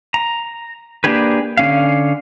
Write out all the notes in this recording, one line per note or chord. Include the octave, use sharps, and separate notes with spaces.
A#5
A#3 D4 G4 G#4 B4
D3 C#4 F5